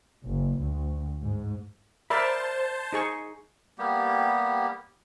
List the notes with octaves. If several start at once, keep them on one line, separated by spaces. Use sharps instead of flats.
F#1
D2
G#2
A#4 C5 D5 E5 A5 B5
D#4 G#4 C#6
G3 A#3 B3 G4